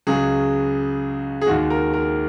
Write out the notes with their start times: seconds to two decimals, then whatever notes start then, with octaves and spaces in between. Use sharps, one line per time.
0.07 C#2 C#3 F#3 G#4
1.41 G#4
1.47 D#2 D#3 G#3 F#4
1.70 A#4
1.94 A#4